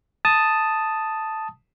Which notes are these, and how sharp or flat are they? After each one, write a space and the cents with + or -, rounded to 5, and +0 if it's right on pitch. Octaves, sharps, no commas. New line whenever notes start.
A5 +0 D#6 +0